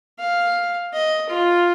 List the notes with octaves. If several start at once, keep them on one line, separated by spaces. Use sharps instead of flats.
F5
D#5
F4